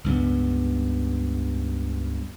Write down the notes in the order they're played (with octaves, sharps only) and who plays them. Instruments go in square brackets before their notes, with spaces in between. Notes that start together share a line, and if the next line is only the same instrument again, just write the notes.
[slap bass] C#2 G2 B3